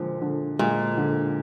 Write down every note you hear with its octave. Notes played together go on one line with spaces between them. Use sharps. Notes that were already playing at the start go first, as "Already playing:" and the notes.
Already playing: A#2 D3 F3 G#3
D3
A#2 G#3
D3